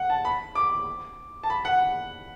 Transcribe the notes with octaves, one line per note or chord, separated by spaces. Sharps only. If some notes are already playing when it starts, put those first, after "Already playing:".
Already playing: F#5
A5
B5
D6
A5
B5
F#5